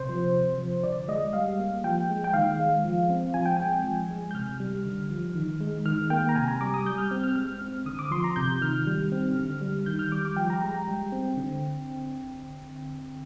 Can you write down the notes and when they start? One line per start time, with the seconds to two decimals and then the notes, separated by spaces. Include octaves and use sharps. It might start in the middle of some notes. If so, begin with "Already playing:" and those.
Already playing: C3 C5
0.09 F3
0.34 C3
0.58 F3
0.84 D3 D5
1.08 G#3 D#5
1.33 G3 F5
1.59 A#3
1.84 F3 G5
2.10 G#3
2.24 G5
2.34 D#3 F5
2.60 G#3
2.85 F3
3.10 C4
3.34 F3 G#5
3.46 G5
3.57 G#3 G#5
3.84 F3
4.10 G#3
4.31 G6
4.35 C3 F6
4.60 G3
4.86 D3
5.11 F3
5.35 D#3
5.61 G#3
5.86 D#3 F6
6.10 A#3 G5
6.29 A#5
6.36 C3 G#5
6.48 A#5
6.61 G3 D6
6.74 D#6
6.85 G3 G6
6.98 F6
7.11 C4
7.24 F6
7.36 G#3 F6
7.62 C4
7.86 D3 D#6
7.99 D6
8.11 F3 C6
8.24 A#5
8.36 C3 G6
8.61 D#3 F6
8.87 G3
9.12 C4
9.36 D3
9.62 G3
9.86 D#3 G6
9.99 F6
10.12 G3 D6
10.25 D6
10.37 F3 G5
10.50 A#5
10.62 G#3 A#5
10.74 G5
10.87 G3
11.12 C4
11.37 D3